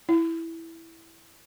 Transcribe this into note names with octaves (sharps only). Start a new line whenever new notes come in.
E4